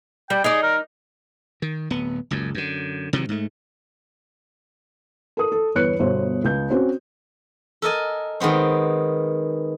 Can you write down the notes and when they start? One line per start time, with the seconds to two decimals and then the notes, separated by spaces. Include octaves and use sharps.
0.30 G3 G5
0.44 D#4 G#4 D5
0.63 A#4
1.62 D#3
1.90 D1 B3
2.31 F#1 C#2 F#2
2.54 F#2 D3
3.13 C3 D#3 E3 F#3
3.29 G#2 A3
5.37 A4 A#4 D#6
5.52 A4
5.75 G1 E2 B4 C#5 F#6 C#7
5.99 G1 B2 C5 C#5
6.44 C#2 G6
6.70 C4 C#4 F#4 C5
7.82 A4 A#4 D#5 G#5
8.40 D#3 G#3 B3 C4